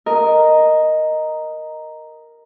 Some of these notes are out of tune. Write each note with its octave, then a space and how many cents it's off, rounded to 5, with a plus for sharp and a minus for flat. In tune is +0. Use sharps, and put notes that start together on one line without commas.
A#4 +0 D#5 +0